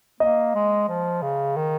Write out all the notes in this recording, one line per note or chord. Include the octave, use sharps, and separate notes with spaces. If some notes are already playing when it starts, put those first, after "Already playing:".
A#3 D#5
G#3
F3
C#3
D#3